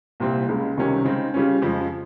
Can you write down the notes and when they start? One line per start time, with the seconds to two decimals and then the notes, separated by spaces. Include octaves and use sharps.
0.20 C2 A#2 G3 C4
0.48 C#2 C#3 G#3
0.77 C#2 C3 D#3 G3 C#4
1.05 C#3 G#3 C4 D#4
1.33 C#3 G3 C#4 F4
1.62 F2 C#3 F3 G#3